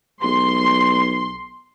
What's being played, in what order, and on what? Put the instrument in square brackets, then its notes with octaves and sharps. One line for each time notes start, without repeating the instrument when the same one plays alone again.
[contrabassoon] B1 [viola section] C6